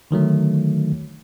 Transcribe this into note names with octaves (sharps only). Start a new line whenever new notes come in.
D3 D#3 F#3 A3